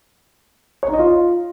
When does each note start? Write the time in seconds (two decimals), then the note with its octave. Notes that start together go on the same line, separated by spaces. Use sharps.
0.83 C#5
0.88 D#4
0.94 D#5
0.99 F4